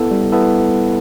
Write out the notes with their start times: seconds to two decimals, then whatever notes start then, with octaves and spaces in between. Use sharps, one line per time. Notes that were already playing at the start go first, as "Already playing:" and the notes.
Already playing: B3 E4 A4
0.11 G3
0.32 B3 E4 A4